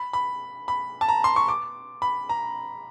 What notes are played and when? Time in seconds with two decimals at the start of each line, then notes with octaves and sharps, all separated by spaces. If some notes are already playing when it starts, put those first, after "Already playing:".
Already playing: B5
0.13 B5
0.68 B5
1.01 A5
1.08 A#5
1.24 C6
1.36 C#6
1.48 D6
2.02 B5
2.29 A#5